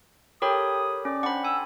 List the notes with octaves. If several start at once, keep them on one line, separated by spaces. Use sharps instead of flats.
G4 A4 A#4 C#5 B5 D#6
C#4 D5
D4 C5 F#5 B5
G#5 E6